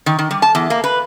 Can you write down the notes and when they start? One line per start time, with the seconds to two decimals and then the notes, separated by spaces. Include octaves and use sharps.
0.06 D#3
0.19 D#3
0.31 G3
0.42 A5
0.55 E2
0.70 A#3
0.84 B4